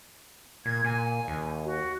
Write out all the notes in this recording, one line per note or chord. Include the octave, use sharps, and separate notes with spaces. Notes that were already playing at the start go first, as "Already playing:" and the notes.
A#2 G#6
A#2 G#5
D#2
F#4